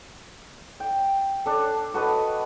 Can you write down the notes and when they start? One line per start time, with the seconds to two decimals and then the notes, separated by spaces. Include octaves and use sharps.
0.80 G5
1.46 D4 A4
1.94 F#4 A4 B4 D#5